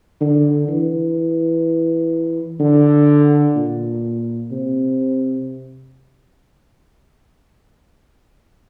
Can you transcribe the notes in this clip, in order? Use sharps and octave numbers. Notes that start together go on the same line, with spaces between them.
D3
E3
D3
A#2
C3